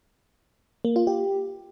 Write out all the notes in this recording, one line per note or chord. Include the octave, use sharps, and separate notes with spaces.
A#3
F4
G4